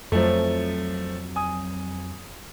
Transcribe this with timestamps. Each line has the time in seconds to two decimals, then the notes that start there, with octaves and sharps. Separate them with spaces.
0.12 F2 F3 F#3 A3
1.36 G#5 D#6